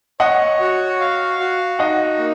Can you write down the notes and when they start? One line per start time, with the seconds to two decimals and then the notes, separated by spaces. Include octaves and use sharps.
0.20 C#5 D#5 F#5
0.60 F#4
1.00 F5
1.39 F#4
1.79 D#4 D#5 F#5
2.18 A#3